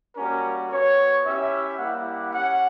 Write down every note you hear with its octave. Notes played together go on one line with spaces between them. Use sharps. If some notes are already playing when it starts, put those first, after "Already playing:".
G3 A#3 C#4 F#4 A#4
B3 F#4 C#5
C#4 E4 G4 E5
G3 A#3 E4 G4 F#5
C#4 G4 F#5